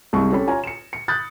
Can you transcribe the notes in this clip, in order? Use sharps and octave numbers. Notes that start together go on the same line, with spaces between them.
C2 G#3 C#6
C#4 G4 A4 C#5 B5
F4 C#5 G#5 A#5
C#7 E7
C#7
B5 D#6 F#6 G6 A6